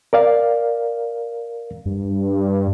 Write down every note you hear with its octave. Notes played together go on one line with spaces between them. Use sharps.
A#4 D5 F5
G2